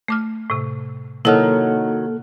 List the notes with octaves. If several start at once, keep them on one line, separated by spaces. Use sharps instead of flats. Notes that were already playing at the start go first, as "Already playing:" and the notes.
A3 D6 F6
A2 C3
C3 D#3 F#3 A#3 E4 A4 F6